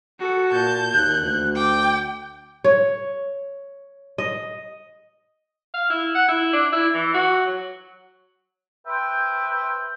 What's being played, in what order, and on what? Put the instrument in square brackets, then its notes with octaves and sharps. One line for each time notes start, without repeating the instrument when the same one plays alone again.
[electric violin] F#4 A4
[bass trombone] A#2 [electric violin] A5 [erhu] G6
[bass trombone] D#2 [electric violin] F#6
[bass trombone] D2
[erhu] G5 [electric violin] D6
[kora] C#5
D#5
[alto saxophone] F5
E4
F#5
E4
D4
E4
E3
F#4
F#3
[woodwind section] B4 C5 E5 G5